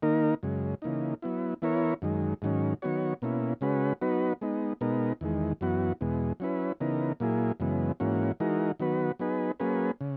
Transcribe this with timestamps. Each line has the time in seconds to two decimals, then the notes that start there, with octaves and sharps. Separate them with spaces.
0.02 D#3 A#3 D#4 A#4
0.43 F#2 C#3 G#3
0.82 C#3 E3 A#3 D#4
1.22 F#3 B3 E4
1.62 E3 B3 E4 A#4 C#5
2.02 F#2 D#3 G#3
2.42 G#2 D#3 F#3 C#4
2.82 D#3 F#3 B3 F#4 C#5
3.22 B2 A#3 C#4 E4
3.61 C#3 G#3 C#4 F#4 B4
4.01 F#3 B3 D#4 F#4 B4
4.41 G#3 B3 D#4
4.81 B2 G#3 B3 D#4 A#4
5.21 E2 D#3 G#3
5.61 F#2 E3 B3 F#4
6.01 E2 B2 G#3
6.40 F#3 C#4 E4 B4
6.81 C#3 E3 B3 D#4 A#4
7.20 A#2 F#3 A#3 E4 G#4
7.60 F#2 C#3 E3 G#3 B3
8.00 G#2 E3 A#3 C#4 F#4
8.40 E3 G#3 D#4 F#4 A#4
8.80 D#3 F#3 B3 F#4 B4
9.19 F#3 B3 D#4 G#4 B4
9.60 F#3 A#3 C#4 G#4 B4
10.01 C#3